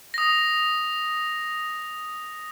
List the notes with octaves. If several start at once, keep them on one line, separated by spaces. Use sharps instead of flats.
D#6 A#6